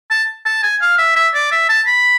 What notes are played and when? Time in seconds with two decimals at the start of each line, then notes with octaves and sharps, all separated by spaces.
0.11 A5
0.45 A5
0.63 G#5
0.82 F5
0.98 E5
1.16 E5
1.34 D5
1.52 E5
1.69 A5
1.87 B5